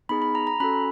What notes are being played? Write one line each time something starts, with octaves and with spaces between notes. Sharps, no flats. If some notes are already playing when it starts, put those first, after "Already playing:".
B3 D#4 G#4 B5
B5
A#5
A#5
C#4 F#4 A4 B5